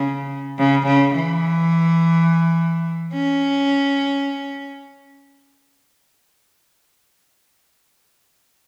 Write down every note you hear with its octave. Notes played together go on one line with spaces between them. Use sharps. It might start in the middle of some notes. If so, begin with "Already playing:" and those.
Already playing: C#3
C#3
C#3
E3
C#4